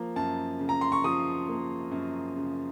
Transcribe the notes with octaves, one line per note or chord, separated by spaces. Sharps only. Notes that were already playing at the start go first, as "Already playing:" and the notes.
Already playing: F3 A#3
F#2 A5
C#3
A#5
C6
C#6
F3 D#6
A#3
F#2
C#3